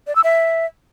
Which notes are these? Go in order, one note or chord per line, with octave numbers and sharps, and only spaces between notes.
D5
E6
E5